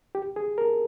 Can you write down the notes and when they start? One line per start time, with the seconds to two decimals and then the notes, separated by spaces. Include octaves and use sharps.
0.15 G4
0.36 G#4
0.58 A#4